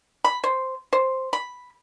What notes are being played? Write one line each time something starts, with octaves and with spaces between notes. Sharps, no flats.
B5
C5
C5
B5